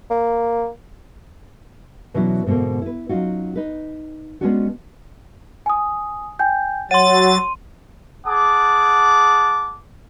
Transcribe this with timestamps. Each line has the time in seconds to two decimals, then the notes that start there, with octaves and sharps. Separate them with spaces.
0.10 A#3
2.14 B2 E3 F#3 C#4 D4 E4
2.46 G#2 B2 D3 A3 A#3
2.82 E4 B4
3.09 F#3 C#4 D#4 F4 F#4
3.56 D#4 B4
4.41 G#3 B3 C#4 D4 F4 F#4
5.66 G#5 D#6
6.39 G5 G#5 G6
6.91 F#3 C#5 F#5 C6 A6 D#7
8.25 G#4 F#5 A5 D6